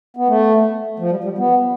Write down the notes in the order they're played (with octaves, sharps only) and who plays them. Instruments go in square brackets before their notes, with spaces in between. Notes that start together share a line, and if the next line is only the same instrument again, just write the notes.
[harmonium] B3
A3
F3
G3
G3
B3